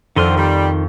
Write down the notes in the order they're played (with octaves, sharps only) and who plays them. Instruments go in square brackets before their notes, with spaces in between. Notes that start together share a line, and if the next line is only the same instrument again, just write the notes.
[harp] F2 D#7 [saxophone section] D3 C4 [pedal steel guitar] D#3 C6 F6
[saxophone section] G3